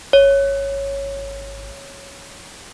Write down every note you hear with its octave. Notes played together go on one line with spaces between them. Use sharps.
G#1 C#5